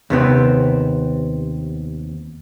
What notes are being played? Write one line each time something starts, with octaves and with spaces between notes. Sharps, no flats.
D#2 C3 B3 C4